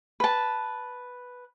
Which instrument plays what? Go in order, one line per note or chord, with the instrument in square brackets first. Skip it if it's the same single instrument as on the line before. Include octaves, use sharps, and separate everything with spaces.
[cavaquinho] B4 A5